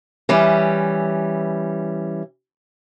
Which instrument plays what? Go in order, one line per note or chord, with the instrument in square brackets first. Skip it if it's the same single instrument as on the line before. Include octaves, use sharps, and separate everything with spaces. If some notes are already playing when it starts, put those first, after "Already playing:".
[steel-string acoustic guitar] E3 G3 C#4